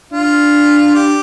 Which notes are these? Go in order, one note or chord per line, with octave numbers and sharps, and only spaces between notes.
D4 F4
G4